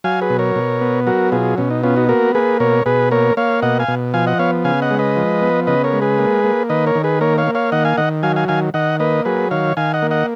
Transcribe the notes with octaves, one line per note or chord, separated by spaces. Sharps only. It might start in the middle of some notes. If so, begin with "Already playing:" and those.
F#3 F5 G#5
G#4 B4
B2
A#4 C#5
B2
B3
F#3 F#4 A#4
B2 F4 G#4
B2 C#4
D#4
B3 C#4 F4
D#4 F#4
A#3 F#4 A#4
A#3 G#4 B4
B2 A#4 C#5
B2 G#4 B4
A#3 A#4 C#5
A#3 C#5 F5
B2 D#5 F#5
F5 G#5
B2
F3 F5 G#5
D#5 F#5
B3 C#5 F5
C#3 F5 G#5
D#5 F#5
G#3
B4 D#5
F3
B3
C#3 B4 D#5
A#4 C#5
G#3
G#4 B4
A#3
A#3
D#3 B4 D#5
A#4 C#5
D#3
G#4 B4
A#3 A#4 C#5
C#5 F5
A#3
C#5 F5
D#3 D#5 F#5
F5 G#5
D#3 D#5 F#5
F#3 F5 G#5
F5 G#5
D#3 F5 G#5
D#3 D#5 F#5
A#3 B4 D#5
F#3 G#4 B4
D#3 C#5 F5
D#3 F5 G#5
D#5 F#5
A#3
D#5 F#5